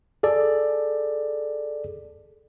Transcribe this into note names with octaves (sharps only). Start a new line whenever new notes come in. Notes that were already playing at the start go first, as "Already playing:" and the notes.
G#4 A4 D5